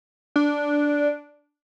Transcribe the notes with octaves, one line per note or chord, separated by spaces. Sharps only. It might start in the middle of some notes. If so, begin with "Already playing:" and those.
D4